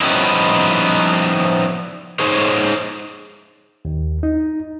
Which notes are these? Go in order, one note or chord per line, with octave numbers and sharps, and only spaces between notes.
F3 G3 B3 C#4 D#4 E4
D#4 G#4 C5 C#5
D#2
D#4